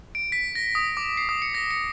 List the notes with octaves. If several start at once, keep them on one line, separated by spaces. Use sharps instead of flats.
D7
B6
A#6
D#6
D6
C7
D#6
C#7
A#6
C#7